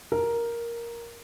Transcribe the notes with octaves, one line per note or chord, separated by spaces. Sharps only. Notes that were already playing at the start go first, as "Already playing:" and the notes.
A#4